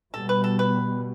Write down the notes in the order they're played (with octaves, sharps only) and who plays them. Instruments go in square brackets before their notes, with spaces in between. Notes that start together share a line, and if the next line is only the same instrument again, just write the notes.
[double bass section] B2 G3 B3 [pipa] A4
[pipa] B4
A4
B4